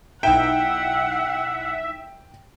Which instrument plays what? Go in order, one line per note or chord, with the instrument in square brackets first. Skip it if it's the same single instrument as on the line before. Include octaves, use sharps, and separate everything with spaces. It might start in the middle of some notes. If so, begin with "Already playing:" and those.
[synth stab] B1 D#4 E4 [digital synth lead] E5 [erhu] F#5 [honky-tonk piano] G5